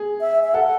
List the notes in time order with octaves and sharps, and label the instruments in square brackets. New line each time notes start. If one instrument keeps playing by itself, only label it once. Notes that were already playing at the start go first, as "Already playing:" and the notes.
Already playing: [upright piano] G#4
[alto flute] E5
E5
[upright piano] A4 [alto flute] F#5